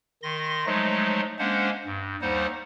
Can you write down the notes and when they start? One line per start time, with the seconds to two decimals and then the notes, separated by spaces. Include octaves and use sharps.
0.23 D#3 C6 A#6
0.66 F3 F#3 G#3 A3 D#4
1.39 G#3 A#3 C#4 D4 C5 F#5
1.85 G2
2.22 D#2 G3 D#4 C5 F#5